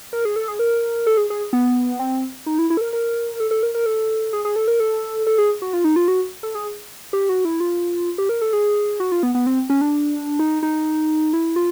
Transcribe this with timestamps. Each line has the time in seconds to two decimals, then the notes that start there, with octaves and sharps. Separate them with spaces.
0.13 A#4
0.25 G#4
0.36 A4
0.48 G#4
0.59 A#4
1.06 A4
1.17 G#4
1.30 G#4
1.53 B3
1.99 C4
2.46 D#4
2.59 E4
2.70 E4
2.77 A4
2.81 A#4
2.93 A#4
3.40 A4
3.51 A4
3.63 A#4
3.75 A#4
3.86 A4
4.33 G#4
4.45 G#4
4.56 A4
4.68 A#4
4.80 A4
5.27 A4
5.38 G#4
5.62 F#4
5.73 F4
5.84 D#4
5.96 F4
6.08 F#4
6.43 A4
6.55 G#4
7.13 G4
7.29 F#4
7.45 E4
7.60 F4
8.18 G4
8.29 A#4
8.41 A4
8.53 G#4
9.00 F#4
9.12 F4
9.23 B3
9.35 B3
9.47 C4
9.70 C#4
9.81 D4
10.39 D#4
10.63 D#4
11.33 E4
11.56 F4